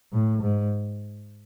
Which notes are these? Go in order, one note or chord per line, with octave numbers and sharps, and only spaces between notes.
A2
G#2